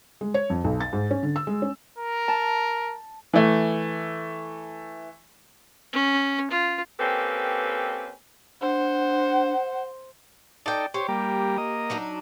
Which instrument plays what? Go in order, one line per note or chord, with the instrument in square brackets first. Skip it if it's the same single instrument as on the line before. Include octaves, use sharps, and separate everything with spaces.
[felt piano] G#3
C#5
F2
B1
A6
G#2
C#4
D3
E6
G#3
C#4
[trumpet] A#4
[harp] A5
[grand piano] E3 A3
[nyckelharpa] C#4
F4
[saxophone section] A#3 C4 C#4 G4 A4 B4
[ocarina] D4 [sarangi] C5 [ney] F#5
[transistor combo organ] D#4 A4 [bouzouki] D5 G5
[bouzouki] G4 [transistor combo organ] C5 C#5
[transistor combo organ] G3 A#3
A#3 D#5
[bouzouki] F#3 D4 D#4